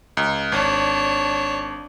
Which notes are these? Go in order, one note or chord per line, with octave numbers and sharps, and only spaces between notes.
C#2
G#1 D4 C#5